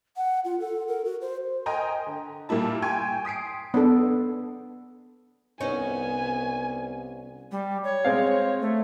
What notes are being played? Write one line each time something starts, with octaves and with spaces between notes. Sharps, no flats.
F#5
F4
A4
A#4
F#4
C5
A#4 D#5 G5 G#5 A#5 C6
D3
A#2 G3 A#3 E4 A5
G5 G#5 C6 C#6 G#6
D#6 B6 C7 D7
B3 D4 A4
C2 B3 C#4 D#4 C#5 G#5
G3
C#5
G#3 C4 F5
A3